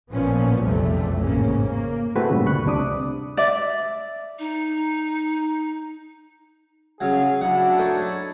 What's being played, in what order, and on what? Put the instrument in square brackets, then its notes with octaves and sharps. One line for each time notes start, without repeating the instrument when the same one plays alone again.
[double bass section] A1 A#2 F3 B3 C#4
F1 B1 E2 C3 G3 A3
A1 G#2 C#3 A#3 C#4
A#3
[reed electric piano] A3 C4 E4 F#4 G#4 B4
G2 A#2 C#3
D2 D3 B5 C#6 F#6
C2 C3 D4 D6 D#6
[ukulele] D5 E5
[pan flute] D#4
[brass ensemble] C#3 G#4 F5 [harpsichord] F#3
[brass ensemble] F#3 D4 E4 [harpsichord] F#5
[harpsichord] D#4 A4 C#5